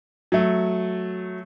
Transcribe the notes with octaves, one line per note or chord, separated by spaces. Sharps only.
F#3 A3